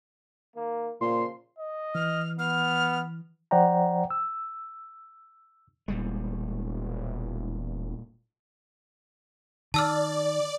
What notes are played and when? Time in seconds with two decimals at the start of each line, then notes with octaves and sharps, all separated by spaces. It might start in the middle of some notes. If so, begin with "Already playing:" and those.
0.55 D#3 A#3
1.01 A#2 C#3 F3 C6
1.59 D#5
1.95 E3 F6
2.39 B3 F6
3.51 F3 C5 D5 F#5 G5 A#5
4.10 E6
5.88 E1 A#2 G3 G#3
9.74 D#3 D5 A5 E6 F6